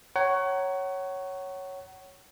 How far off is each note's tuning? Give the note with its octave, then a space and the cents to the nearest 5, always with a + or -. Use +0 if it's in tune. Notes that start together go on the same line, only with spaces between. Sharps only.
C#5 +0 F#5 +30 A#5 +0